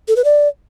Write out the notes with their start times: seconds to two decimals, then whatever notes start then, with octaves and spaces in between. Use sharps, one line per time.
0.08 A4
0.16 B4
0.25 D5